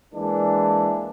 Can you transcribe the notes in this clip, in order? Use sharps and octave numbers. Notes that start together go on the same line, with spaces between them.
E3 G#3 A#3 D4